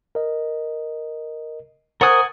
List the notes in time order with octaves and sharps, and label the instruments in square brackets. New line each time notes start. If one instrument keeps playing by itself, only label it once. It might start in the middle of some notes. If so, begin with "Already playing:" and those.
[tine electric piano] A#4 D#5
[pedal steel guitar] A#4 D#6 [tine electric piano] C5 C#6 A6 [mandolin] F#5 G#5